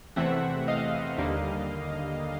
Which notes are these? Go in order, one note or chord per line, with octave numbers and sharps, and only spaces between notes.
E2 C3 E3 A3 C4 E5 F#5
D#5 F5
D#2 D3 G3 A#3